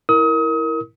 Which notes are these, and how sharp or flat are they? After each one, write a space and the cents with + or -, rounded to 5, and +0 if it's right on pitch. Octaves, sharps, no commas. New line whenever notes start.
E4 -15 A#4 +0 D#6 +35